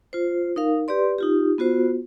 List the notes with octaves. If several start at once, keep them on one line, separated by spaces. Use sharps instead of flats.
F4 C5
D#4 A#4 F5
G4 B4 D5 C6
D#4 F4 G4
B3 F4 F#4 C5